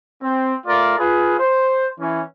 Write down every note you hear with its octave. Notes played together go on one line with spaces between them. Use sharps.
C4
A3 F4 A#4 D5
F4 G#4 B4
C5
E3 C#4